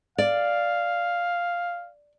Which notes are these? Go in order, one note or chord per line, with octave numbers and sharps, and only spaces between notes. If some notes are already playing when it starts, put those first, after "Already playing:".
D5 F5